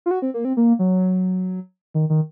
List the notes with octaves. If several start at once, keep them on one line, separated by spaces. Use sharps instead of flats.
F4
F#4
C4
A#3
C4
A#3
F#3
D#3
D#3